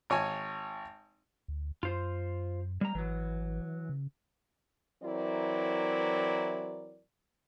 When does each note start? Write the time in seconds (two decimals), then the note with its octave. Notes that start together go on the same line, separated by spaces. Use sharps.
0.10 G#1 C#5 G#5
1.48 D2
1.83 F#2 F4 C5
2.81 G3 A#5
2.95 G#1 E3 F#3
3.89 C#3
5.03 E3 F#3 C4 E4 A#4 D5